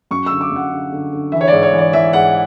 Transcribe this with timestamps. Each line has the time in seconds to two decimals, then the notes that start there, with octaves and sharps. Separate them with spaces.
0.11 F#2 C#6
0.26 D3 E6
0.41 D6
0.51 F#2 F#5
0.71 D3
0.92 D3
1.13 D3
1.32 E3 E5
1.41 C#5
1.48 G#2 D5
1.63 C#5
1.73 E3
1.78 D5
1.93 E3 E5
2.13 G#2 F#5